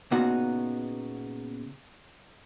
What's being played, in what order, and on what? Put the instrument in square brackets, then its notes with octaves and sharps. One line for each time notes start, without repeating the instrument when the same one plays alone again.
[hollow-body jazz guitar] A#2 C#3 B3 D#4 F#4